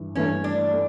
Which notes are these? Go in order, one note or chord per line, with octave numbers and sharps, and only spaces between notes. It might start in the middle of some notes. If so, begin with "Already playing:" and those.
Already playing: G2 E3
G2 E3 A3 C#4
D4
A3